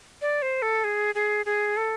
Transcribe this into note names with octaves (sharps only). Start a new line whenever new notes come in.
D5
C5
A4
G#4
G#4
G#4
A4